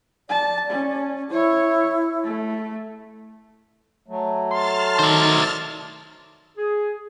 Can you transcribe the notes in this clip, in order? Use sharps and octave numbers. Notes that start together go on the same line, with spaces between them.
D5 A5
C#4
E4 C#5
A3
F#3 A3
A5 C6 F6 A6
D#3 C5 D5
G#4